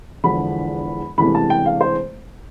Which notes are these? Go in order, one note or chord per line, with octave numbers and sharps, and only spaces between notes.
E1 E2 D3 F3 B5
E1 E2 C3 E3 A3 B5
A5
G5
F5
C5